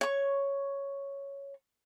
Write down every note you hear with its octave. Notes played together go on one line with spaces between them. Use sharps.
C#5 C#6